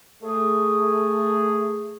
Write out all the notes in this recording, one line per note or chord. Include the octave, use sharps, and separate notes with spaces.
A3 G#4